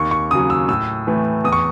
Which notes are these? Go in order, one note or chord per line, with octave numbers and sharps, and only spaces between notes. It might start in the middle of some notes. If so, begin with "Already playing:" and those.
Already playing: D#2 C#6
C#6
C#3 F#3 D#6
E6
A2 E6
E3 A3
E2 D#6
C#6